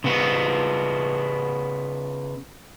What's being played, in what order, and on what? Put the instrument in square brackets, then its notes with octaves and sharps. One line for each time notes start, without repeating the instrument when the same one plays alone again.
[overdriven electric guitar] C#3 B3